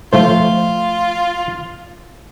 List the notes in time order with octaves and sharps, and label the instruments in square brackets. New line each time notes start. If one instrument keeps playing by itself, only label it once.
[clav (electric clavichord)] F3 A3 C5 [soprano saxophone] F4